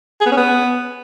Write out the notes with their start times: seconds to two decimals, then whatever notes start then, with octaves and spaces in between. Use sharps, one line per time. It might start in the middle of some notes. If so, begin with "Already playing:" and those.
0.21 G#4
0.26 B3
0.32 C#4
0.37 B3